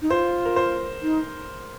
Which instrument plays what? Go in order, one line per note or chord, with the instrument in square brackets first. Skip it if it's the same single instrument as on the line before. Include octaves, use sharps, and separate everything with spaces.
[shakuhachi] D#4
[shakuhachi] F4 [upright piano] C5
[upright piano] A#4
C5
[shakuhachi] D#4